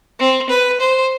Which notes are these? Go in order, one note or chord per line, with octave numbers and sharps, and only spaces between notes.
C4
B4
C5